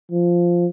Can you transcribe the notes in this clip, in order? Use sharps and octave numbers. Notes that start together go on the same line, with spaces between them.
F3